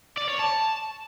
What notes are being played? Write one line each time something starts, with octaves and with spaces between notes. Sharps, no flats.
D5
C#5
A5